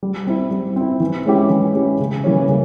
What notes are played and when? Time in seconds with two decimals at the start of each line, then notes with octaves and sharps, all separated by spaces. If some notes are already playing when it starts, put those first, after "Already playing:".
0.03 G3
0.27 C4 E4
0.51 G3
0.76 C4 E4
1.00 E3
1.25 G#3 C#4 E4 G4
1.50 E3
1.75 G#3 C#4 E4 G4
2.00 C#3
2.24 E3 G3 A#3 C#4
2.48 C#3